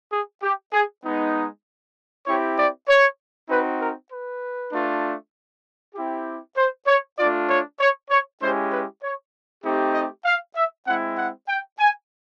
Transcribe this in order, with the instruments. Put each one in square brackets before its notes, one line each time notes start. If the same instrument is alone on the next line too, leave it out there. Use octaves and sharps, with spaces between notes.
[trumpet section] G#4
G4
G#4
G#3 B3 D#4
C4 E4 G4 C#5
D5
C#5
C4 D#4 F#4 B4
A#4
B4
A3 D4 F4
C4 E4 G4
C5
C#5
A3 D4 F4 D5
C#5
C#5
C#5
G#3 C#4 E4 G4 C5
B4
C#5
A3 C4 D#4 G4
D#5
F5
E5
G#3 C4 E4 F#5
F#5
G5
G#5